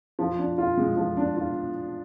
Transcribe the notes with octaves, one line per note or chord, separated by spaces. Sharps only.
F3
D4
F4
G#3
F3
D4
F4